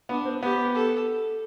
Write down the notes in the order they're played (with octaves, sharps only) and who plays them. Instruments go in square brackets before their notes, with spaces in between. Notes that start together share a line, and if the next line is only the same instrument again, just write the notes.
[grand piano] B3 [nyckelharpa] D4
[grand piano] C4
[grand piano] B3 [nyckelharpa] G4
[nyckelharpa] A4